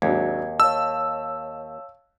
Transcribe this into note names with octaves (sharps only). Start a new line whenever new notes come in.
G#1 D#2 F#3 D4 G#6
C#5 D#5 F5 A5 E6